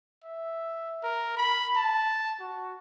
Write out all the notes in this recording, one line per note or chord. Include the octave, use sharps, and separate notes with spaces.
E5
A#4
B5
A5
F#4